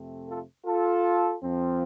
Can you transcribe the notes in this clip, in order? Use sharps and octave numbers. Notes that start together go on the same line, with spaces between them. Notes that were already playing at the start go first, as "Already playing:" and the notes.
Already playing: F2 C3 A3 C4
F4 A4
F4 A4
F2 F3 C4